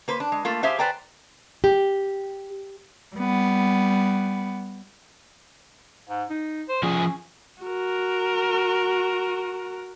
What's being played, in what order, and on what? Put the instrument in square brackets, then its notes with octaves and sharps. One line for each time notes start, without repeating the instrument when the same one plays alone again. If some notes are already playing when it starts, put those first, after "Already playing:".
[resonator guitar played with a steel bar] A#3 B4 C5
D4
G#3
A3 A#3 F4
G4 G#4 C5 E5 F5
B4 C5 D5 G5 G#5 A#5
[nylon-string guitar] G4
[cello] G3 B3
[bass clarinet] G#2
D#4
C5
[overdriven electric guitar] F3 G#4 [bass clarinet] C#4
[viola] F#4 A#4